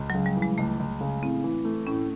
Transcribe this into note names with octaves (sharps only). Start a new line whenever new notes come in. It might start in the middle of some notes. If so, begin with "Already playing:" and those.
Already playing: C#2
C#3 F#3
G3
E3
G#3
C#2 A3
C#2
C#3
A2 C4
E3
A3
A2 C#4